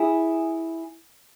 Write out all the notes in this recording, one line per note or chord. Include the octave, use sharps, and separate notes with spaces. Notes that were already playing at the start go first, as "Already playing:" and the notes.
Already playing: E4 G#4